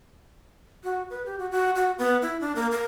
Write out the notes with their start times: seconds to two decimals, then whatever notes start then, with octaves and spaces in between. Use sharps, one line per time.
0.84 F#4
1.10 B4
1.26 G4
1.39 F#4
1.52 F#4
1.76 F#4
1.98 B3
2.22 E4
2.41 D4
2.56 A#3
2.71 A#4